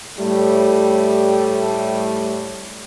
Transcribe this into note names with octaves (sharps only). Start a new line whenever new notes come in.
A2 G3 A3